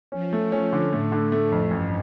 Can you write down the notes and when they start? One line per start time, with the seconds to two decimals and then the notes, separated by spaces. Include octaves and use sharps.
0.12 F3 C#4
0.33 A3
0.52 C#4
0.73 D3
0.93 A2 A3
1.12 D3
1.32 A3
1.52 F2
1.71 A1 G2